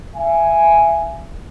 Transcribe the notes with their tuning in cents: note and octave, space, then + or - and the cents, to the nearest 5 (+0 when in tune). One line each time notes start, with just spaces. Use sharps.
E5 +25 G#5 +0